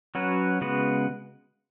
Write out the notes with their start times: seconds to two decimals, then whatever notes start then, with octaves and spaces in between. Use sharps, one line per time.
0.15 F#3 C#4 F#4 B4
0.61 C#3 G#3 B3 F#4 B4